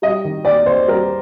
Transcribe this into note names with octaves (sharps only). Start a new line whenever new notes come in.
G3 D#5
D#3
D#2 D5
D#2 C5
G3 A#4